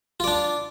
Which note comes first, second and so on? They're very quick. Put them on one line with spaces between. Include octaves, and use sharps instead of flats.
F4 D5 D4